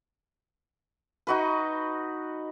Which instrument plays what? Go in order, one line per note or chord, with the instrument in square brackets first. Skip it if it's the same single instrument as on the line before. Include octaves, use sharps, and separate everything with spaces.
[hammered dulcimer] D#4 F#4 B4